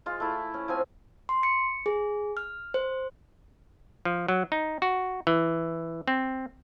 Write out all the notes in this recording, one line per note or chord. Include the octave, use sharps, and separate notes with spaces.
G#3 F4
A3 E4
C#4
F3 C4 G#5
C6
C#7
G#4
F6
C5
F3
F#3
D#4
F#4
E3
C4